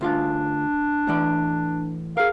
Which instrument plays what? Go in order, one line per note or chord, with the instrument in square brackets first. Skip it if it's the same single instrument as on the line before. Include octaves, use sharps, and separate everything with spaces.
[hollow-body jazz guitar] D2 F4 F5 [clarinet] D4
[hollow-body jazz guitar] A2 E3 D5
[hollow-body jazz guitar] G#4 A#4 [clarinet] F5